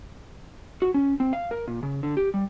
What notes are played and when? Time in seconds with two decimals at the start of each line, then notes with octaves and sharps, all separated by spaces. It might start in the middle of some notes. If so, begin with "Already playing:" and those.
0.82 F#4
0.94 C#4
1.20 C4
1.33 F5
1.51 A#4
1.68 A#2
1.83 C#3
2.03 D3
2.17 G4
2.34 G3